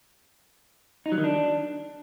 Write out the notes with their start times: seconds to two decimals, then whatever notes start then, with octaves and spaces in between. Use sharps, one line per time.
1.06 D#4
1.12 F#3
1.18 D#3
1.24 D4